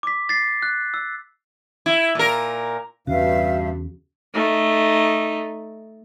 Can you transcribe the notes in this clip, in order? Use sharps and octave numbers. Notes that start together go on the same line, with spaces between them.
D6 B6
A6 C7
F#6
E6
E4
A#2 A#4
E2 G2 C#3 F#4 E5 F5
A3 D#4